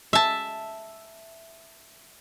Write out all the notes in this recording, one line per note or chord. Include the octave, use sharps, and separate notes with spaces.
E5 A5